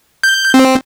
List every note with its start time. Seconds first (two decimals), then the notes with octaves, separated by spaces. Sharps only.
0.23 G6
0.54 C4